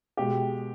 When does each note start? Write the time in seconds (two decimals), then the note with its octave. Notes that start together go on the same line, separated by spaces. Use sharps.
0.17 B2 G#3 G4